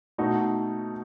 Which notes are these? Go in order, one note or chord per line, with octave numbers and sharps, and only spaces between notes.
B2 A3 D#4 F#4